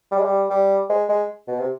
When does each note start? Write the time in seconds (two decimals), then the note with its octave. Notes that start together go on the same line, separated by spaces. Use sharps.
0.12 G3
0.19 G#3
0.25 G3
0.50 G3
0.90 G#3
1.09 G#3
1.48 B2
1.60 C3